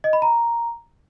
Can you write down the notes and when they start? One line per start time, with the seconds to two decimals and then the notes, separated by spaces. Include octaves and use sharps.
0.04 D#5
0.13 B5
0.22 A#5